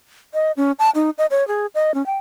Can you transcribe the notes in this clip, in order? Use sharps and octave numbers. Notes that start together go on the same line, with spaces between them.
D#5
C#4
A5
D#4
D#5
C#5
G#4
D#5
C#4
G5